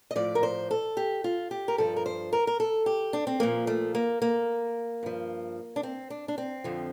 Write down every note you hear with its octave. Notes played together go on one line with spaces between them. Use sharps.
D#5
A2 F3 D5
A#4
C5
A4
G4
F4
G4
A#4
G2 F3 A4
A#4
C5
A#4
A#4
A4
G4
D4
C4
A#2 F3 A#3
A3
A#3
A#3
G2 F3
D4
C4
D4
D4
C4
F2 D3 F3